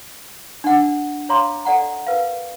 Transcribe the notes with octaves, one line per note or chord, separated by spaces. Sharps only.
D4 F#5
C#5 F5 A#5 C6 D6
A4 D5 F#5 A#5
A#4 B4 F5